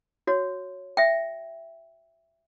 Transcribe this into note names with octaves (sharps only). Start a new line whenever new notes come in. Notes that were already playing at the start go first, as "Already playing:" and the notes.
F#4 C#5
E5 G5